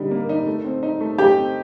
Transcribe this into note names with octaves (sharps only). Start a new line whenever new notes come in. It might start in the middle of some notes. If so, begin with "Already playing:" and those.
Already playing: D3 G3 D#4
A#3
D#4
A3
C4
D#4
A3
A3 G4
C4